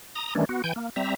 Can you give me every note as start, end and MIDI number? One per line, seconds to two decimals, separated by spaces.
0.15 0.34 82
0.15 0.34 87
0.35 0.45 51
0.35 0.45 52
0.35 0.45 55
0.35 0.45 57
0.35 0.45 61
0.35 0.45 62
0.49 0.62 59
0.49 0.62 66
0.64 0.73 52
0.64 0.73 79
0.64 0.73 80
0.64 0.73 91
0.76 0.90 58
0.96 1.15 55
0.96 1.15 60
0.96 1.15 76
0.96 1.15 82